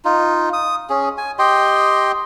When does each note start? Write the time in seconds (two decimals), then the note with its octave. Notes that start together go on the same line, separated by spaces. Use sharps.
0.05 D#4 F4
0.53 D#6
0.90 C#4 G#4
1.18 G#5
1.39 G4 D#5 G5 C6